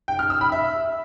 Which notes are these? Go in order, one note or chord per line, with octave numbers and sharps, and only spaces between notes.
G5
F6
E6
B5
E5